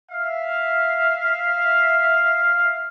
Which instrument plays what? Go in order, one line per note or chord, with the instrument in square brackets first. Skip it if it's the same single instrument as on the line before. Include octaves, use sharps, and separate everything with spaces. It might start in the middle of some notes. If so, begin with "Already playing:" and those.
[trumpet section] E5 F5